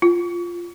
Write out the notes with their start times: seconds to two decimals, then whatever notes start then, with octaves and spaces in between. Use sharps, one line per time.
0.02 F4